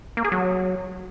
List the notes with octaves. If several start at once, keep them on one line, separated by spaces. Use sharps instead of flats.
A#3
G#4
F#3